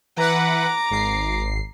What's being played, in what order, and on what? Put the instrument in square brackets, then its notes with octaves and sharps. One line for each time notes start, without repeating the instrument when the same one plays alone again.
[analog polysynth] E3 B4 F#5 [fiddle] A#5 D6
[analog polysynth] G#1 C7